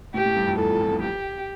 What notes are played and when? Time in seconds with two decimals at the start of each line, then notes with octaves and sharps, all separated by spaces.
0.14 A2 G4
0.26 A2
0.36 G2
0.47 F2
0.58 E2 A4
0.70 F2
0.81 F2
0.93 G2
1.03 G4